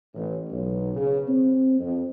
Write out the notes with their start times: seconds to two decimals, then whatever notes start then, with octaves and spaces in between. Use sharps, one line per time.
0.15 A1
0.50 B1
0.95 C#3
1.28 C4
1.80 F2